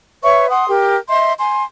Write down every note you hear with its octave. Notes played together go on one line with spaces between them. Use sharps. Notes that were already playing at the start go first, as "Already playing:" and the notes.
B4 C#5 E5 C#6
F#5 C6 D#6
G4 A#4
D#5 E5 C6
G#5 C6